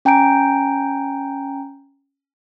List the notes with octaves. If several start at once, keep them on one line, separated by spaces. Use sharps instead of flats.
C#4 G5 G#5 A#5 G6 D7